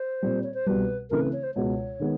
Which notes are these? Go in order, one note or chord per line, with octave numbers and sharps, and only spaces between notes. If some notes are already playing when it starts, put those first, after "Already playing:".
Already playing: C5
A#2 G3 C4
C#5
C5
C2 B2 G3 B4
C#3 E3 A3 C4 A#4
B4
C#5
C5
C#2 B2 G#3 C#5
D#3 G#3 B3